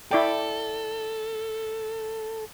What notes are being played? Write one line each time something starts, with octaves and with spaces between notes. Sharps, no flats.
E4 A4 D5 G5